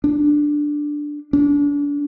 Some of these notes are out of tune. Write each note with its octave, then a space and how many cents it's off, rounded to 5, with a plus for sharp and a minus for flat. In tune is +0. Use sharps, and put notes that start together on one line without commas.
D4 +5
D4 -35